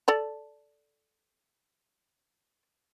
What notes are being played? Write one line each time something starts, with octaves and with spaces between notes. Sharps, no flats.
A4 D5 A5